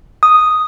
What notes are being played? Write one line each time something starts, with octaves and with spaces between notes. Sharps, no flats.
D#6